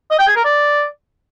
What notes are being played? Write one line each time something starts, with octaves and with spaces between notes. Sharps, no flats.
D#5
G5
G#4
A#4
D5